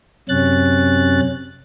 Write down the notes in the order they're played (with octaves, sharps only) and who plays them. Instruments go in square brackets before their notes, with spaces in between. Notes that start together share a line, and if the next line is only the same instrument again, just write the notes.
[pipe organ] F#2 C3 C#4 F#6 A6